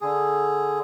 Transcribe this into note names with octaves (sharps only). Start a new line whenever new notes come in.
D3 G#4